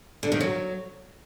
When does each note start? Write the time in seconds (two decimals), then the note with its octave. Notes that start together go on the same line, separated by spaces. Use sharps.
0.23 D3
0.32 D#3
0.40 F#3